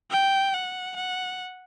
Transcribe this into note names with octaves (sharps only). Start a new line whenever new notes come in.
G5
F#5
F#5